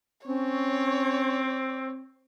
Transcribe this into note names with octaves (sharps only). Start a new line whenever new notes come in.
C4 C#4 C#5